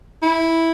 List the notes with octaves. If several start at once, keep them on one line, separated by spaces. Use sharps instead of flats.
E4